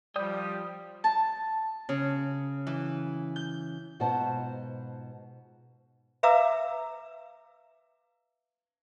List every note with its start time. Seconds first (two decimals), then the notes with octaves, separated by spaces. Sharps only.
0.16 F3 G3 D5 G5 D#6 G6
1.04 A5
1.89 C#3
2.67 E3
3.36 G6
4.00 G#2 B2 F4 C5 F#5 A5
6.23 B4 E5 F5 A#5 D6 E6